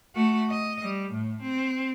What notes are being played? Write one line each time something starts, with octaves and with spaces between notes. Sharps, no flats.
A3 F#4
D#5
G3
A2
C4